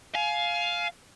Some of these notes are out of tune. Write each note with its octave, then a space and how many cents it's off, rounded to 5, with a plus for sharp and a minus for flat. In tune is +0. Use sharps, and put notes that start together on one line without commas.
F5 +0 G#5 +25